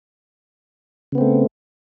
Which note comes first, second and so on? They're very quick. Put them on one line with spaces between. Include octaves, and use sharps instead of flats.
C#3 B3 C4 A3